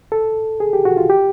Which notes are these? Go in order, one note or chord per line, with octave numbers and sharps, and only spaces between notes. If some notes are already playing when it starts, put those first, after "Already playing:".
A4
G#4
G4
F#4
F4
G4